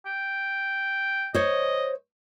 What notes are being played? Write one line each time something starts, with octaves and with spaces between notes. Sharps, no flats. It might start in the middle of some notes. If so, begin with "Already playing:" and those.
G5
C5 C#5 D#5